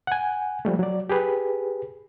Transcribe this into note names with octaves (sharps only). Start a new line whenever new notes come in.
F#5 G#5
F3 G3 A3
F#3 D5
G4 G#4 B4